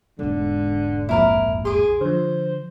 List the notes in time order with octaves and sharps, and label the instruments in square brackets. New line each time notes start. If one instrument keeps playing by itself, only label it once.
[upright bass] E1 G#2 [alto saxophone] D3
[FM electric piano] A#1 F2 A#2 [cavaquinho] E4 A#4 D6
[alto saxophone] G#4 [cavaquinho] C6 D6
[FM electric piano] D3 F3 [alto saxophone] C5